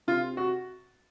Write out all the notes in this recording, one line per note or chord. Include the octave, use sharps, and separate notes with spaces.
C3 F4
F#4